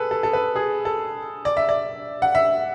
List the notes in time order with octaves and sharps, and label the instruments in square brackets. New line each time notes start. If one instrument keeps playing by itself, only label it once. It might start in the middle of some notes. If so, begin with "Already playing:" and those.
Already playing: [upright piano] G#4 A4 B4
A4
A4
B4
G#4
A4
D5
E5
D5
F#5
E5